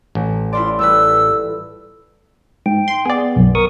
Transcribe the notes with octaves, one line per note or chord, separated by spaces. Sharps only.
A1
E4 F4 D5 C6
G3 A4 B4 E6
G#2 G5
C6
B3 G#4 D5
B1 F#2
A#4 C#6 D#6